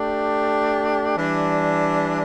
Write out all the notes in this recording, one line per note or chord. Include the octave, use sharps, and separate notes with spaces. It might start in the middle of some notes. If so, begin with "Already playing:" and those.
Already playing: A3 D4 G4
E3 G3 D4